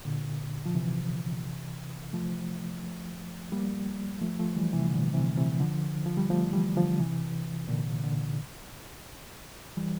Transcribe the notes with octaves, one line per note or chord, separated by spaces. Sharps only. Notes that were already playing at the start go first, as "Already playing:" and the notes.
A#2 D3
F3
C3 E3
F3 A3
G3 A#3
F3 A3
F3 A3
E3 G3
C3 E3
A#2 D3
C3 E3
C3 E3
D3 F3
F3
G3
F3 A3
E3 G3
D3 F3
C3 E3
A#2 D3
A#2 D3
E3 G3